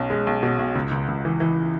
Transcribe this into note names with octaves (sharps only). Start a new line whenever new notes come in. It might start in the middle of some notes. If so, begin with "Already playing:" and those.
Already playing: B1 C#4
G#3
B1
B2
B1
C#2
C#2
C#2
E3
E3